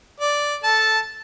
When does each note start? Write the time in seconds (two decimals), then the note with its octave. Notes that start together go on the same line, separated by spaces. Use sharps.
0.20 D5
0.64 A4 A5